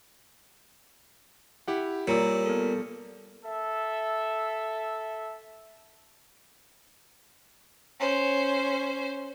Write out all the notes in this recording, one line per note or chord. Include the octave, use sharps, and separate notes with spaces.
E4 G4 F#5
A#2 G3 C#5 A#5 E6
B3 A4
A4 E5
C#4 C5